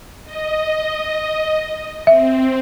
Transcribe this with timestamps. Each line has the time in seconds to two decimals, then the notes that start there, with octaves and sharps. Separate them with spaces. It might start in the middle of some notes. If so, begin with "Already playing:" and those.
0.24 D#5
2.07 C4 E5